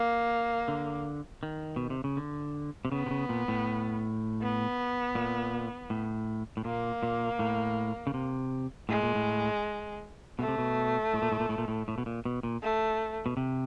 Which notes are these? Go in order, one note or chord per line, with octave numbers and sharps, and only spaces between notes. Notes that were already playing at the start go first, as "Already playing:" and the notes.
Already playing: A#3
D3
D#3
B2
C3
C#3
D3
C3
C#3 B3
C3
C#3
A#2
A2
B3
A#2
A2
A2
A#2 A#3
A#2
A2
C#3
C3
A2 G#3
A#2
A2
B2 A3
C3
B2
A2
A#2
A2
A#2
A2
A#2
A2
A2
B2
A#2
B2
A#2
A3
B2
C3